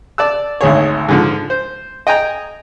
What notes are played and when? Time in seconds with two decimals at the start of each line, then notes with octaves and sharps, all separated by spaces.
0.18 D5 A5 E6
0.61 G#1 D2 G#4 C#5
1.09 G#2 D3 F3
1.50 C5
2.07 D#5 G5 G#5 A#5